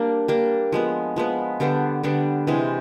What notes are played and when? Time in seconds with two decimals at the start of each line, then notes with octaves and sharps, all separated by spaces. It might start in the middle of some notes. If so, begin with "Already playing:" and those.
Already playing: G3 A#3 D4
0.28 G3 A#3 D4
0.72 F3 G#3 B3
1.16 F3 G#3 B3
1.60 D3 G3 B3 D4
2.03 D3 G3 B3 D4
2.47 C3 E3 G#3 C4